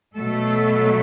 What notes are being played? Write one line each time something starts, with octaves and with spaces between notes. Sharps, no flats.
B2 F#3 A3 A4